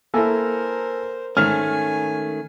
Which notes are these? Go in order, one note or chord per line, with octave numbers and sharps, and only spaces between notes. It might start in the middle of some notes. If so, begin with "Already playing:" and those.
A#3 E4 A4 A#4 C5 G#5
G#2 D#3 A3 C#4 G#5 F6